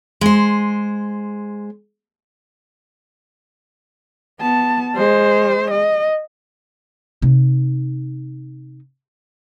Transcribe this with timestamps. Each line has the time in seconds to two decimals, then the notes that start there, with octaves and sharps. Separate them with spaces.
0.21 G#3 C5
4.41 B3 A5
4.95 G#3 C5
5.71 D#5
7.22 C3 D#4